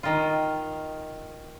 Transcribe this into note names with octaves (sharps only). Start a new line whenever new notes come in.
D#3 F4